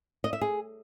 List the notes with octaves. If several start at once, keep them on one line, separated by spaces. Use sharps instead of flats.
D#5
E5
G#4